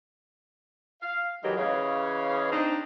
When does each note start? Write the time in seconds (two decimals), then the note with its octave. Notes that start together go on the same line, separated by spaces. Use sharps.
1.02 F5
1.43 D#3 E3 F#3 G#3 G4
1.57 C#3 E3 C#5 D#5 F5
2.52 C4 D4 D#4